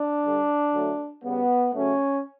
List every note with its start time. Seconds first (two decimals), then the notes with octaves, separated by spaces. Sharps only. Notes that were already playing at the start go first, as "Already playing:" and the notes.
Already playing: D4
0.23 D3 G3
0.73 D3 F#3 A3
1.24 C#3 G3 B3
1.73 C#3 F#3 A3 C#4